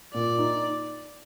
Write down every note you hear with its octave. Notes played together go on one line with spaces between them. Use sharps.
A#2 D5
D#4